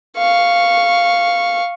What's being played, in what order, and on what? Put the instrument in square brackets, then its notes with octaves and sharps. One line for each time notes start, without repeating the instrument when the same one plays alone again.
[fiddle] F5 C#6